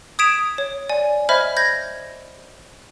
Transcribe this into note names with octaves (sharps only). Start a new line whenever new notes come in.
D#6 G#6 B6 D7 E7 F7
C#5
D5 G#5
C5 D#5 E5 B5 F6 G#6
G6 G#6 A#6